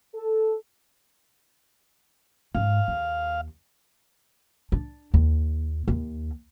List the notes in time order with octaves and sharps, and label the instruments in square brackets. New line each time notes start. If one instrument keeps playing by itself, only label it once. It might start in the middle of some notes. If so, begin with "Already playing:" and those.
[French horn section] A4
[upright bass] G#2 [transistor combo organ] F5
[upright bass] D#2
D4
D#2
D#2